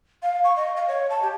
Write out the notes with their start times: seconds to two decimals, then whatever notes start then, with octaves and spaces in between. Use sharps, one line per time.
0.23 F5
0.44 C#6
0.56 D#5
0.77 F5
0.88 C#5
1.10 A5
1.22 G4